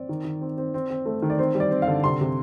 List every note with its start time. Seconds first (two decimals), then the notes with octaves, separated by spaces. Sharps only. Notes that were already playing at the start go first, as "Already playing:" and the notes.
Already playing: C4 D5
0.09 D#3
0.25 D#3
0.41 C4
0.58 C4
0.74 C4
0.90 C4
1.06 A3
1.22 D#3
1.30 D5
1.38 C4 C5
1.55 G3
1.60 D5
1.71 C4
1.82 F5
1.88 D3
2.04 C3 C6
2.21 C3